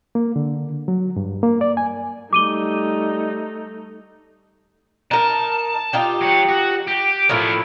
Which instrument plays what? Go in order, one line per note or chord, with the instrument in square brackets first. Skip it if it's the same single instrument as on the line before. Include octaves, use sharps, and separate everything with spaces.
[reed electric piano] A#3
D3
F#3
G2
A#3
D5
G#5
[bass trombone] G3 [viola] A3 D#4 [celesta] D6 D#7 G7
[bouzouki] D#4 A#4 [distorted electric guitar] A5
[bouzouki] D#4 F4 G4
[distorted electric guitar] F#3 C#5
F#4
G4
[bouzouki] A2 F3 E4 [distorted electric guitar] B3 A#4